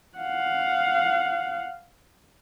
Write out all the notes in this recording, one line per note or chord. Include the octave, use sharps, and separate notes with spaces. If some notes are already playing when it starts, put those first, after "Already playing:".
F5 F#5